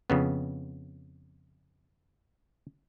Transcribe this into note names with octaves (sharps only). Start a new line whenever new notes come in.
F2 C#3 B3